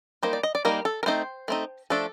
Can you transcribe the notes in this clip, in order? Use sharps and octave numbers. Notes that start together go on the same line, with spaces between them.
G3 A#3 D#4 C5
D5
D#5
D5
G3 A#3 D#4 A#4
A4
A#4
A3 C4 D#4 C5
A3 C4 D#4
F3 A3 D4 A4